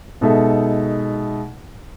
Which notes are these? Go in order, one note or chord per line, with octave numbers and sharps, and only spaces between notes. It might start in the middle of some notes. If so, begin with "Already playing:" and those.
B2 G#3 D#4 A4 E5